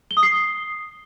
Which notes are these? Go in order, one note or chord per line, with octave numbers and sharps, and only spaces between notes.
G7
D#6
C7